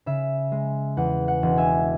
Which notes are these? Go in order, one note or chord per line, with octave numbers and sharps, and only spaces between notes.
C#3 E5
G#3
E2 F#5
F#5
E1
E5 G#5